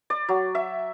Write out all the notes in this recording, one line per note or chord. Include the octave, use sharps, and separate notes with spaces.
D5
F#3
E5